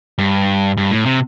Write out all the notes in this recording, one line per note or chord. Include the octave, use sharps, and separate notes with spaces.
G2
G2
A2
C3